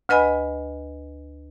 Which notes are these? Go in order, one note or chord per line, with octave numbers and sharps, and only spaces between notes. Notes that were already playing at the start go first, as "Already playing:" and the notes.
D2 B4 D#5 G#5 B5